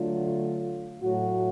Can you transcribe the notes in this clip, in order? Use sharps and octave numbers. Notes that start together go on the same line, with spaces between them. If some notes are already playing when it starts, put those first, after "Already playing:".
Already playing: D3 F#3 A3 F4
A2 F#3 A3 F#4